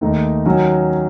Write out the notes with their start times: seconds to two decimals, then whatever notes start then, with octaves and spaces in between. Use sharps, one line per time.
0.01 D#2 D#3 A3 D#4
0.45 D#3 F#3 C#4 F#4